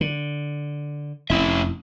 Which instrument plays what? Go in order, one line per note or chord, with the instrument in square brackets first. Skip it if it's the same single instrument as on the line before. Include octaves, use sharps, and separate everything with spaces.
[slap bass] D3
[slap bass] F1 [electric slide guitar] C#4 E4 E5